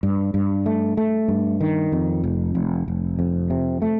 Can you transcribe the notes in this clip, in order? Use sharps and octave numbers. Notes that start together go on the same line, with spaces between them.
G2
G2
A3
A3
G2
D#3
F2
F1
F1
F1
F2
C3
A3